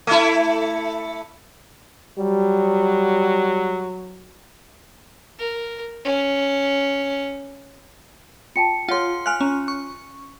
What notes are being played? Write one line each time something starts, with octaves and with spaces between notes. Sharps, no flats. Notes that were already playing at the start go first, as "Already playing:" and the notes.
A3 E4
F#3 G3
A#4
C#4
F4 G5 A5 C#7
F4 G#4 C#5 F#5 C6
F5 G#5 F6 F#6
C#4 A#5
C#6